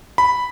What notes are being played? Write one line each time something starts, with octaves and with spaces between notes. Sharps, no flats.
B5